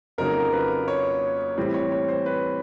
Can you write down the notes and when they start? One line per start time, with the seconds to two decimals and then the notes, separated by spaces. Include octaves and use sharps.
0.18 F2 C#3 F#3 A#3 D#4 A#4
0.52 B4
0.88 C#5
1.58 A2 E3 G3 C4
1.74 C#5
1.92 C#5
2.08 C5
2.26 B4